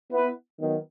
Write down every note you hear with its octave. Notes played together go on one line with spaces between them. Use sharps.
B3 E4 B4
D#3 F#3 B3